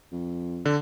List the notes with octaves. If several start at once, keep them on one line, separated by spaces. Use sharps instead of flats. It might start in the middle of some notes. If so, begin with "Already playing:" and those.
F2
D3